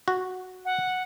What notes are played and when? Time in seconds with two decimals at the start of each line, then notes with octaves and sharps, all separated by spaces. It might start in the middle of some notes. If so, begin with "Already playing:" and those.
0.08 F#4
0.65 F#5